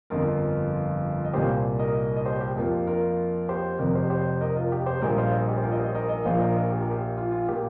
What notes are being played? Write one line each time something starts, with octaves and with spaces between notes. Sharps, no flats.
G1 F2 F3 F4 A#4
D#5
C2 A#2 A#3 G4 C5
A#4 D#5
D#5
G4 C5
G4
F2 F3 A#3
F4 A#4
G4 C5
F1 F2 C3 A#4 D#5
G4 C5
G4 C5
A#4 D#5
F4 A#4
G4
G4 C5
A#1 A#2 G3 A#3 A#4 D#5
C5 F5
A#4 D#5
G4
C5
F4 A#4
D#5
G4 C5
A#4 D#5
A#4 D#5
A#1 A#2 F3 A#3 C5 F5
A#4 D#5
F4 A#4
G4
A#4
G4
F4
F4
A#2 A#3 G4